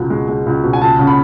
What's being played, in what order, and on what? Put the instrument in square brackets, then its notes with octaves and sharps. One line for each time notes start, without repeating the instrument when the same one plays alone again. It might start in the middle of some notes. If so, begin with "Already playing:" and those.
Already playing: [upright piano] C#2 B2
G#3
G#3
C#2
B2
G#5
C#2 A5
C#3
B5